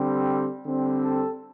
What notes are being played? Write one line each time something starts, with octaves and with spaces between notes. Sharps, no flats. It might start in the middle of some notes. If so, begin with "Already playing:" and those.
Already playing: D3 G3 C4
D3 G3 C4
A4